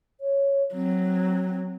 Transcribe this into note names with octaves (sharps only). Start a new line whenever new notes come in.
C#5
F#3 C4